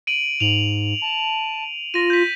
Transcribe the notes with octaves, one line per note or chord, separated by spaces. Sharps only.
D7 D#7 F#7
G#2 F7 F#7
A5
F4 A#6 D#7
G6 B6